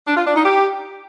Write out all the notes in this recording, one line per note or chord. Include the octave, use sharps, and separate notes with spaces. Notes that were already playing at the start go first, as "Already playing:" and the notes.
D4
F4
D4
D#4
G4